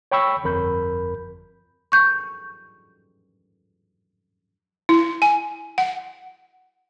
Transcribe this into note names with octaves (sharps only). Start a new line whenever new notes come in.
C#5 G5 B5 C#6 E6 B6
G1 F2 A#4 B5 G6
C#6 G6
E4
G#5
F#5